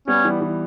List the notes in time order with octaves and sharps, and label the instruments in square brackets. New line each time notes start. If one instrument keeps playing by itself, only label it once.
[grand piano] G3 B3 [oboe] C#4
[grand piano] E3 G3
E3 G3